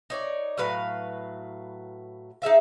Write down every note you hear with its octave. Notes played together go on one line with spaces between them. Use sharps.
D#4 C#5 D5
A2 F#3 B4 F5
D#4 G#4 E5 F5